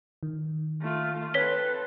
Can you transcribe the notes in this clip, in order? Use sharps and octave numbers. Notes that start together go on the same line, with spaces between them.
D#3
A3 F4
C4 A4 B4 C#5 B6 G7